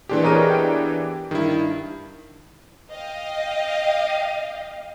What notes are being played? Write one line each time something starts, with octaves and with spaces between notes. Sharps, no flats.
A#2 E3 D4 E4 G4 G#4
B3 G#4 A#4 C#5 D#5 D#7
G5
G2 D#3 E4
D#5 F5 G5